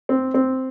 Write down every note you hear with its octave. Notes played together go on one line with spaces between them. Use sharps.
C4
C4